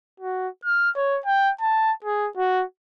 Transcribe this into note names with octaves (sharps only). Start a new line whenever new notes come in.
F#4
F6
C#5
G5
A5
G#4
F#4